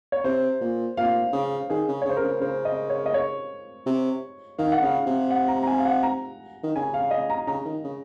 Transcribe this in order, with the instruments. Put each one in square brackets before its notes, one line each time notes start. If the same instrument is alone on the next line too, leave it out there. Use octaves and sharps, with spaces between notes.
[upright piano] C#5
[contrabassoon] C3 [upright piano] C5
[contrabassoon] A#2
[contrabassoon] A#2 [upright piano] F5
[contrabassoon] C#3
[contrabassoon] D#3 [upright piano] G#4
[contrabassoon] C#3
[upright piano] C#5
[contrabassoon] C#3 [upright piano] C5
[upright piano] A#4
[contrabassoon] C#3
[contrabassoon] C#3 [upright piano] C5
[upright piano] D#5
C#5
D#5
C#5
[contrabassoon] C3
[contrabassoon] D#3 [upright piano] F5
[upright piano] F#5
[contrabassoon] C#3 [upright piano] F5
[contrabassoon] C3
[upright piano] F#5
A#5
A#5
G#5
F5
F#5
A#5
[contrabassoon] D#3
[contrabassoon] C#3 [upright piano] G#5
[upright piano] F5
D#5
A#5
[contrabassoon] C#3 [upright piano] A#5
[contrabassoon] D#3
C#3